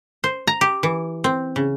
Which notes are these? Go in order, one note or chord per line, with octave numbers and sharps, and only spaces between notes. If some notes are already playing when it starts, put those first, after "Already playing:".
C5
A#5
G4
E3
C4
C#3